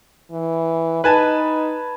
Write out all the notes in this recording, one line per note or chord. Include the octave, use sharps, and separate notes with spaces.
E3
D#4 B4 G#5 A5